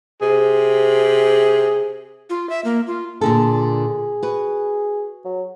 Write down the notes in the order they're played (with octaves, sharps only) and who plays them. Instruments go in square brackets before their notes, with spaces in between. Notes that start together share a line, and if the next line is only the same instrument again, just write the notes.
[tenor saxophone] C3 [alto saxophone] G#4
[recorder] F4
E5
A#3
F4
[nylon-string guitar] A#2 D3 A4 [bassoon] G#4
[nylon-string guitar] F#4 B4
[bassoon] F#3